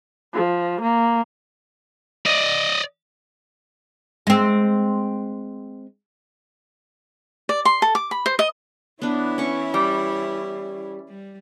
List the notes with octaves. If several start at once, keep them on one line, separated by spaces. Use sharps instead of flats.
F3
A#3
D5 D#5
G#3 C4
D5
C6
A4
D6
B5
C5
D#5
E3 B3 D4 E4 C#5
C#4 C#6
G3
G3